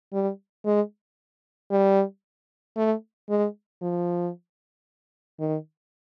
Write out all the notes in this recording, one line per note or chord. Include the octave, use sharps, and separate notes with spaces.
G3
G#3
G3
A3
G#3
F3
D#3